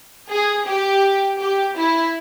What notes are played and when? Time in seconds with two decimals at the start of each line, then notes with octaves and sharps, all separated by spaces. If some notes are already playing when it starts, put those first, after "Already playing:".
0.30 G#4
0.67 G4
1.40 G4
1.76 E4